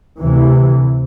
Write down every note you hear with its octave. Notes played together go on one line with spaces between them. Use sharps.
D2 C3 E3